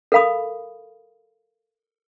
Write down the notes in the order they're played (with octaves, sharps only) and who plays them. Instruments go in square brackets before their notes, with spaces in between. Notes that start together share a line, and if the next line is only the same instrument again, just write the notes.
[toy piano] A4 A#4 F5 B5 D#6